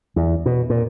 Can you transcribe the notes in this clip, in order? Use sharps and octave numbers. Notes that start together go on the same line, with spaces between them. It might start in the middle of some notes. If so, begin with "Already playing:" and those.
E2
B2
A#2